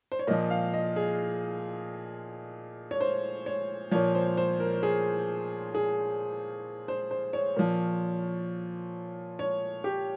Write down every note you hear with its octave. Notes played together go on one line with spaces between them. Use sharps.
C5
C#5
A#2 F3 D#5
F5
D#5
G#4
C#5
C5
C#5
A#2 F3 C#5
C5
C5
A#4
G#4
G#4
C5
C5
C#5
A#2 F3
C#5
G4